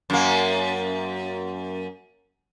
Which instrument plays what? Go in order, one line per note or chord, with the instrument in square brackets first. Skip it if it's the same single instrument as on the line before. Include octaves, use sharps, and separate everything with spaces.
[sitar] F#2 A#3